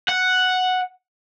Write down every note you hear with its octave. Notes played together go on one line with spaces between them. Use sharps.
F#5